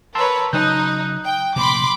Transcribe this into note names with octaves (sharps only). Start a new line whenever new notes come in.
A#4 B4 C#5 A5 C6 E6
C#3 F#3 D#4 D#6 F#6 G6
G5
F1 A#2 C#3 B5 C6 D6